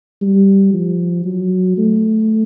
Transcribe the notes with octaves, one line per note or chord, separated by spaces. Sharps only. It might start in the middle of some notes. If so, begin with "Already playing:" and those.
G3
F3
F#3
A3